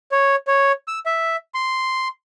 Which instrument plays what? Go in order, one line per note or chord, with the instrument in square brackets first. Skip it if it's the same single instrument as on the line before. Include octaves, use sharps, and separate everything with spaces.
[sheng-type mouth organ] C#5
C#5
E6
E5
C6